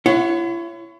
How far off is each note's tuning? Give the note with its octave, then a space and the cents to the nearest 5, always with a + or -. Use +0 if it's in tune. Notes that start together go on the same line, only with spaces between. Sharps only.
E4 +40 C#5 +0 F#5 -10